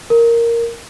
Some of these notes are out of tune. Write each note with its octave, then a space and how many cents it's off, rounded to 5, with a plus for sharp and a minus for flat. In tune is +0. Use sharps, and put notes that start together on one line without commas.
A#4 -5